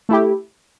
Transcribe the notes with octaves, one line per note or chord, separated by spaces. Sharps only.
A3 E4 G4